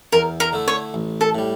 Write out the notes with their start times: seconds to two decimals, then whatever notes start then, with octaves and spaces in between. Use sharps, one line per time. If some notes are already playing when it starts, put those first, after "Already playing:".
0.12 E2 A#4
0.40 A#4
0.53 D3 A3 E4
0.68 C#5
0.94 A1
1.21 A4
1.35 A2 G3